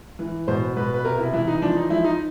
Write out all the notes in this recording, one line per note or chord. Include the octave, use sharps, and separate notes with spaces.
E3
B2 C5
B2 B4
B4
C3 A#4
E4
E3 E4
D#4
F3 D4
D#4
F3 E4
D#4